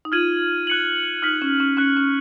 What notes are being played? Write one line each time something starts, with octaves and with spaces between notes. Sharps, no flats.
D#4
F4 F6 G#6 D#7 F#7
F#6 C#7 F#7
D#4 F6 B6 F#7
C#4
C#4
C#4 C#6 F#6 C#7
C#4